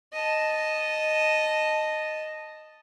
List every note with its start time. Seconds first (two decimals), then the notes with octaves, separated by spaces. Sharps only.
0.13 D#5 A5